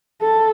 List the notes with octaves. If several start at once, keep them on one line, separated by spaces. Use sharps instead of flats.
A4